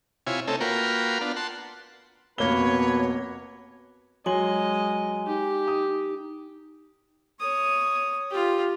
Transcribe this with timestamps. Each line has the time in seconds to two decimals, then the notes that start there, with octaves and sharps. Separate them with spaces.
0.27 C3 E4 F4 C#5 G#5
0.47 A3 C4 C#4 D#4 A4
0.61 A#3 F4 F#4 A#4 B4 G5
1.21 B3 D4 F4
1.36 F#5 A5 C6
2.38 F1 B2 A#3 B4 C#5 G7
4.26 F#3 G#3 D#5 G#5 C6 F#7
5.27 D#4 G4
5.68 D#6
7.40 C#5 D#6
8.31 F4 G4